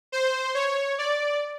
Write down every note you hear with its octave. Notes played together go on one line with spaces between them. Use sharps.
C5
C#5
D5